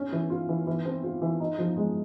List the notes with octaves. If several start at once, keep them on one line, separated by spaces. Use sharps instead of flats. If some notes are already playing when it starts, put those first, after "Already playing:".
Already playing: C#4
E3
F4
E3
E3
C4
F4
E3
D#4
F3
G#3